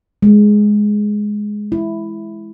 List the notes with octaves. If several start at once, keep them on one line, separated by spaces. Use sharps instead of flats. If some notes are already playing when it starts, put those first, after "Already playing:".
G#3
E4